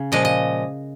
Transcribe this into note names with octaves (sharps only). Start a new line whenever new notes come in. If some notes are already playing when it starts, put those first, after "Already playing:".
Already playing: C#3
A#2 F3 G#3 D#5
D#5